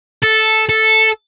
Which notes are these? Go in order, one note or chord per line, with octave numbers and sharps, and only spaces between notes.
A4
A4